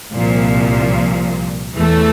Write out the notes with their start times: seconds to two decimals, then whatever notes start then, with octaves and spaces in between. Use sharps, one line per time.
0.12 C2 A#2 F3
1.75 E2 E3 A3